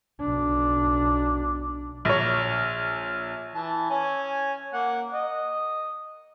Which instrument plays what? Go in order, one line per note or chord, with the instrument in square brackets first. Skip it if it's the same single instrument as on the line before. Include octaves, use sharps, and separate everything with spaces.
[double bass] B1 D4
[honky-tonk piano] A#1 C#5
[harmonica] E3 A5
C#4 G#5
A#3 F#5
D#5